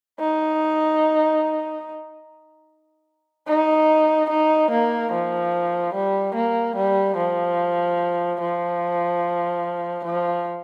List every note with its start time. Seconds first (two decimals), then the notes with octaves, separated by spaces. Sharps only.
0.19 D#4
3.47 D#4
4.30 D#4
4.71 A#3
5.12 F3
5.94 G3
6.35 A#3
6.76 G3
7.17 F3
8.40 F3
10.05 F3